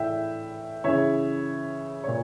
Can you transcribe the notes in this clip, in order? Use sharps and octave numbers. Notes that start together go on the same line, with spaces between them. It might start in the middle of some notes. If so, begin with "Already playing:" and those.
Already playing: A2 E3 E5 G5
C#3 E3 C#5 E5
C#5
A#2